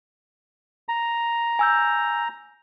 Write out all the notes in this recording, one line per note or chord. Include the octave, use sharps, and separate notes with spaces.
A#5
G#5 E6 G6